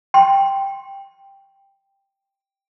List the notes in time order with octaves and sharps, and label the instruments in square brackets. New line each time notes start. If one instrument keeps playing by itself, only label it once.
[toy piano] G5 C6